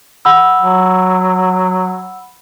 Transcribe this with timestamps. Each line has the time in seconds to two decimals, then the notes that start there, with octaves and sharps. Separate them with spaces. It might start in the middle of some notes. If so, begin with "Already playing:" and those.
0.25 F#5 B5 E6
0.62 F#3